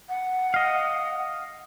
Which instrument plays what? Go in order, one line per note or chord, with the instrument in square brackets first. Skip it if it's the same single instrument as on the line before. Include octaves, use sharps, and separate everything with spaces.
[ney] F#5
[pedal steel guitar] D#5 F5